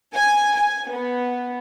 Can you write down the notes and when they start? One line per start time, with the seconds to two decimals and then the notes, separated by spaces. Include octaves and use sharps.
0.15 G#5
0.56 G#5
0.90 B3